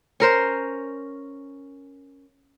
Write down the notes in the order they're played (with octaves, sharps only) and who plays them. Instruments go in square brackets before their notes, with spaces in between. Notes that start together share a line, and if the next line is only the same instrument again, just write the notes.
[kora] C#4 A#4 C5